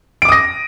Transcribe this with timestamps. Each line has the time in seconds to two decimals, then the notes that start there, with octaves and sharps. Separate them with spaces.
0.22 D7
0.25 D6
0.29 D#6
0.32 A#6